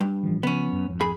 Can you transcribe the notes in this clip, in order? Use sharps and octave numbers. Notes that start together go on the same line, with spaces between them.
G2
A1 E3 F3
C#3 F3 B3 C#4
F#2
G#1 F2
G#4 B5